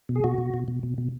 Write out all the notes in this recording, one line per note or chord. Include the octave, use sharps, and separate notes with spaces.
B2
G#4
B2 F#4
B2
B2
B2
B2
B2